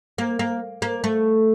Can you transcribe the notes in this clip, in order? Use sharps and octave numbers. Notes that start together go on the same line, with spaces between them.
A#3
A#3
A#3
A3